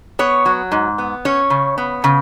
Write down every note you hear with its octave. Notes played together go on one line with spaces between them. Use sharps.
B3 C#5
F#3
G#2
B3
C#4 C#5
C#3
B3
C#3